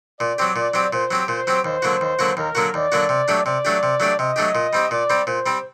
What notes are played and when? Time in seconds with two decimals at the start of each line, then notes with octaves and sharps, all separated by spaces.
0.20 A#2 D5
0.38 F#3 C4 G4
0.56 A#2
0.74 F#3 C4 G4
0.93 A#2 C5
1.11 F#3 C4 G4
1.28 A#2 C5
1.47 F#3 C4 G4
1.64 D#2 C5
1.82 D3 F#3 A#3 F#4
2.01 D#2
2.19 D3 F#3 A#3 F#4
2.37 D#2 A#4
2.55 D3 F#3 A#3 F#4
2.74 D#2 D5
2.92 D3 F#3 A#3 F#4
3.09 C3
3.28 F#3 A3 D4 G4
3.45 C3 D5
3.65 F#3 A3 D4 G4
3.83 C3
4.00 F#3 A3 D4 G4
4.19 C3 D#5
4.36 F#3 A3 D4 G4
4.55 A#2
4.73 G3 C4 G4
4.91 A#2 D5
5.10 G3 C4 G4
5.27 A#2 C5
5.46 G3 C4 G4